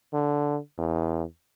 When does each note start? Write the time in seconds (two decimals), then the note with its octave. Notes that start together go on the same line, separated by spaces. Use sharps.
0.13 D3
0.78 E2